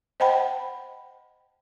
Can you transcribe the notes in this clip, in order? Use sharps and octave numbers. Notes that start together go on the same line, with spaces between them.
C5 D#5 F#5 G5 A5 B5